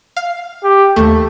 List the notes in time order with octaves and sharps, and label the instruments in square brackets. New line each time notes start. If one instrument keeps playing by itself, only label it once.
[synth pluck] F5
[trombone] G4
[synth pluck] D#2 A3 [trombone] A4